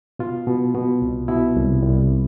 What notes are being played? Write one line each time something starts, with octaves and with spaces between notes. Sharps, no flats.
B2 F4
B2
B2
C2
B2 E4
C2
C2